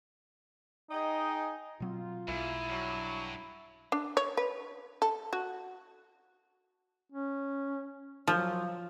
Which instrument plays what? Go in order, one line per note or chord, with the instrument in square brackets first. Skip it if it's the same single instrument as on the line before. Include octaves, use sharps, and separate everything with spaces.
[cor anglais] D#4 [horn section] G#4 D#5 G5
[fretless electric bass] B2 F#3 C4 [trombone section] F4
[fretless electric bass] B1 [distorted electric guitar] G#2 [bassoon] E4
[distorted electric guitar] G2 [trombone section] F#3
[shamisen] D4
C#5
B4
A4
F#4
[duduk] C#4
[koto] F3 [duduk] F#3